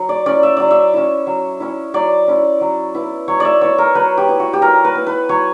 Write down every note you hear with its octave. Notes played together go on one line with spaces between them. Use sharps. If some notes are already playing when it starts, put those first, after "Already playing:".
Already playing: F#3
D5
C#4 E4 D5
E5
F#3 D5
E5
C#4 E4
F#3
C#4 E4
F#3 D5
C#4 E4
F#3
B3 E4
F#3 C#5
D5 E5
B3 E4 C#5
A#4
F#3 B4
G4
B3 E4
F#4
G4
F#3 A#4
B4
B3 E4
B4
F#3 C#5